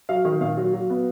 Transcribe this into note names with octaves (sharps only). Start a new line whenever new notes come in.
F#3 F5
D#3
A#2 F5
F#3
F#3
B3